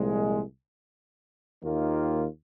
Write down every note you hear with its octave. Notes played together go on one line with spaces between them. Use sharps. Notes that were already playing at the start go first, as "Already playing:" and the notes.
Already playing: C2 A#2 F3 G#3
D#2 D#3 A#3 F4